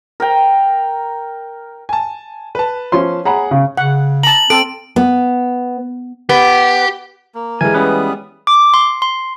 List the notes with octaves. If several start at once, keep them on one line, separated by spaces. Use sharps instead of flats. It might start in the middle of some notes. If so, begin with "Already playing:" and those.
A#4 G5
G#5 A5
B4 A5
F3 C#4 C6
G#4 C#5 F#5 A#5 B5
C#3
C#3 F#5
A5 A#5 F#7
C4 A4 D7
B3
B3 G4
A#3
E3 G3 G#3 A#4 G#5
G3 B3 C#4 B4 D#6
D6
C6
C6